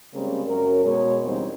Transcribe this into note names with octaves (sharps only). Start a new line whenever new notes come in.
C#3 G3 G#3 A#3 C4 C#4
F#2 F#3 C#4 A#4
B2 G#3 C#5
E2 C#3 G3 A#3 C4 D#4